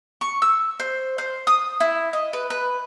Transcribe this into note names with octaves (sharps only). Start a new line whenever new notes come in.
C#6
E6
C5
C5
D#6
E4
D#5
B4
B4